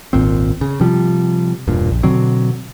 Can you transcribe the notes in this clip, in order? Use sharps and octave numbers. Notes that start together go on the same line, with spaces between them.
D#1 G#1 A#2 C4
C#3
C3 F3 G3
E1 G2 A#2
A#1
B2 D3 F#3 C4